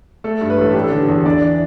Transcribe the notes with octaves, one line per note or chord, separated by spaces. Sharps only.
A3 A4
G2
B4
A1 A4
D4 G4
A4
D3
E2
D4 D5
E3